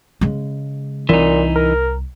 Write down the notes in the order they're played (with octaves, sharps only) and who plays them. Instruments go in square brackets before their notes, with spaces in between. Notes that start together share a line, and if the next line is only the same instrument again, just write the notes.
[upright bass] C#3 G#3
[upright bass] C2 [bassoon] A#2 [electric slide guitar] E3 D#4
[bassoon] A#4